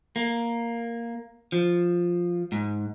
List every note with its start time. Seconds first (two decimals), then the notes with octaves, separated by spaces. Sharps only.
0.16 A#3
1.52 F3
2.52 G#2